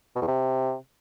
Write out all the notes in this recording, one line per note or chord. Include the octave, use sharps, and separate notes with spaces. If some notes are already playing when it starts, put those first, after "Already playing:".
B2
E2
C3